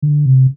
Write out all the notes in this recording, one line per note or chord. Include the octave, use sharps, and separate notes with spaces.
D3
C3